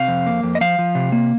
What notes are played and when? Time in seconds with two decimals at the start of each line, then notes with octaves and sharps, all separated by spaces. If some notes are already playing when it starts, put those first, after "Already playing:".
Already playing: C3 F5
0.08 F2
0.27 A#3
0.43 F2
0.55 D#5
0.61 F3 F5
0.78 F3
0.95 C3
1.12 A#3